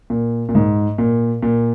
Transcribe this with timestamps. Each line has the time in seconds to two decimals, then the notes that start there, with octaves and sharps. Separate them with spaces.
0.10 A#2
0.49 A#2
0.55 G#2
0.98 A#2
1.43 A#2